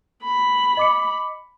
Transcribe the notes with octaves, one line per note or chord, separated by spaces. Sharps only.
B5
D#5 D6 C#7